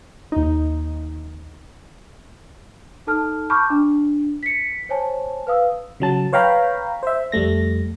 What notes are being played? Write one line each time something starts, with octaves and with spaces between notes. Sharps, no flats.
D#2 D#4
D#4 A4 A5 F6
A5 B5 C#6 D6 F6 G6
D4
B6 C#7
C5 C#5 G#5 A5
B4 F5 D#6 E6
C#3 F#3 A5
B4 C#5 F5 G5 A#5 B5
C5 E5
F2 G3 A3 A#6